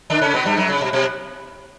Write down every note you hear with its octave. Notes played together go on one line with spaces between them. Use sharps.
D3 D4
C#3 C#4
B2 B3
G2 G3
F#2 F#3
C#3
B2
B2